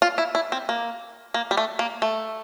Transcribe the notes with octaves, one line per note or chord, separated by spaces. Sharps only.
F4
E4
E4
C4
A#3
A#3
G3
A3
A#3
A3